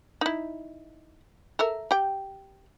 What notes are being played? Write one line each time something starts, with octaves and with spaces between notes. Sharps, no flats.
D#4 E4
A4 A#4 E5
G4 G5